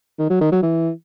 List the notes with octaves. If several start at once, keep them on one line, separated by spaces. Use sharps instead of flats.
D#3
F#3
D#3
F#3
E3